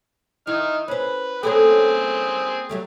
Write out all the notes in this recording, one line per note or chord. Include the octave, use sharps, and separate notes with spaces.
D#4 E4 F6
C#4 B4 C5
A#3 C4 C#4 G#4 A4
F#3 G3 A3